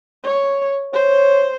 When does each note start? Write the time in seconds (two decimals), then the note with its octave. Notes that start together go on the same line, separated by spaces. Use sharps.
0.24 C#5
0.94 C5 C#5